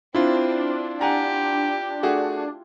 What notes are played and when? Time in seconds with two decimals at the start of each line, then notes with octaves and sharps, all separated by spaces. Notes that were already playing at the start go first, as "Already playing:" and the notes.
0.15 C4 D4 E4 F4
1.01 G4 F#5 G#5 A#5
2.03 A3 F#4 G#4